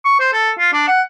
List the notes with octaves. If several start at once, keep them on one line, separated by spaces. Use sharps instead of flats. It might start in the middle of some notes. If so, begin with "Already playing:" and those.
C#6
C5
A4
F4
D4
F#5